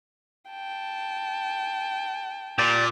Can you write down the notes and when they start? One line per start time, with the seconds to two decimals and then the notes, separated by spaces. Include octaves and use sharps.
0.51 G5 A5
2.58 A#2 G4 D5